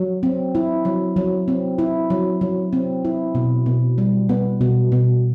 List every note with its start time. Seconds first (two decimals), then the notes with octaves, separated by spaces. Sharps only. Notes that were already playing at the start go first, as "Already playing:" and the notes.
Already playing: F#3
0.23 C4
0.55 E4
0.85 F#3
1.16 F#3
1.48 C4
1.78 E4
2.10 F#3
2.41 F#3
2.73 C4
3.05 E4
3.35 B2
3.66 B2
3.98 G3
4.29 B3
4.61 B2
4.92 B2